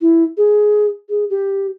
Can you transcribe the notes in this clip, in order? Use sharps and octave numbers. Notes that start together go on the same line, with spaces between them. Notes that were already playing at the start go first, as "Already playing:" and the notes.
E4
G#4
G#4
G4